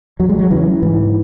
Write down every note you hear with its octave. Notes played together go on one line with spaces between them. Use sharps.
E2 F#3
G#3
F#3
C#3 E3
G#2 E3